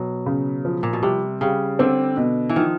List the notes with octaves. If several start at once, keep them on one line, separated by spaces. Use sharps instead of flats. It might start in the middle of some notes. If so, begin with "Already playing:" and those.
Already playing: B2 F#3
C#3
F3
A#2
B2
C3 G3
C#3 G3
D3 C4
B2
E3
D#3 F3